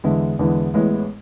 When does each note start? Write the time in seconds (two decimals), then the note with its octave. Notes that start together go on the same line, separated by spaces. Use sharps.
0.04 E2 D3 G#3 B3 E4
0.39 E2 D3 G#3 B3 E4
0.74 A1 A2 G#3 B3 E4